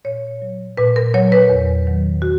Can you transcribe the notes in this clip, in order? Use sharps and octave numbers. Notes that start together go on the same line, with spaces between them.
A#2 C#5
F#3
A#2 B4
A#4
F#3 C#5
B4
E2
D#3 F#3
F#4